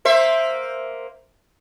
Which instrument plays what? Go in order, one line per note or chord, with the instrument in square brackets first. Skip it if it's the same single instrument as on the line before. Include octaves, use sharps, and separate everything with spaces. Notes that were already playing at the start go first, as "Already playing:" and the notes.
[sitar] A#3 C5 E5